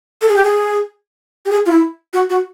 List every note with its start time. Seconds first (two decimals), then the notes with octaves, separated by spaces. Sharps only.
0.22 A4
0.29 G#4
0.36 G4
0.44 G#4
1.45 G4
1.50 G#4
1.66 F4
1.71 E4
2.13 F#4
2.30 F#4